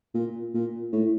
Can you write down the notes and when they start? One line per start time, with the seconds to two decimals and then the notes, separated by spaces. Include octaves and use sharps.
0.14 A#2
0.54 A#2
0.92 A2